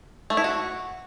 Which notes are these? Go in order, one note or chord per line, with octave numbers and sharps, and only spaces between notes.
A3
E4
F#4